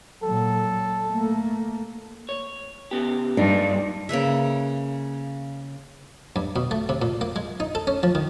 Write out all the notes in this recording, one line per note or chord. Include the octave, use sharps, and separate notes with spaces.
A#2 F#3 A4
A3 A#3
C#5
C#3 B3 G4
G2 A#2 D4 D#4
C#3 A#3 B4 E5
G2
B2
A3
C3
A#2
A#3
G#3
D#4
A4
C#4
F3
D#3